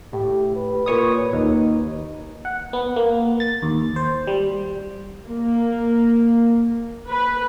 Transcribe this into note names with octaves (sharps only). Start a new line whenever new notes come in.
A2 G4
B4
A#2 C#5 D#6
D#2 D#4
F#5
B3
A#3
A6
D#2
C5
G3
A#3
B4